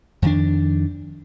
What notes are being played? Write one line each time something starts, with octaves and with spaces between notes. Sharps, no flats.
F2 D#3 D4